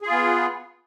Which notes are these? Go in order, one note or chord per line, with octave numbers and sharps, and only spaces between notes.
B3 F4 G#4